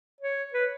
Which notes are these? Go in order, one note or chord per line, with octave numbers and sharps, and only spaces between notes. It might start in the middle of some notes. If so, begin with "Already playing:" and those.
C#5
B4